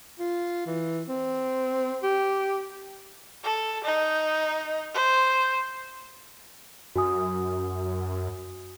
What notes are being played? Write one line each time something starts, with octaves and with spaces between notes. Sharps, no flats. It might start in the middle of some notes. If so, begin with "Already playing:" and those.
F4
E3
C4
G4
A4
D#4
C5
F#2 F#4 G#5 D#6